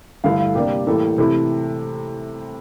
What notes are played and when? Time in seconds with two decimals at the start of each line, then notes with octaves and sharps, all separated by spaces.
0.24 G2 D3 A3 E4 F5
0.40 F5
0.55 C3 G3 A#3 D4 G4
0.87 A2 E3 G3 A#3 A4
1.18 C3 E3 A3 E4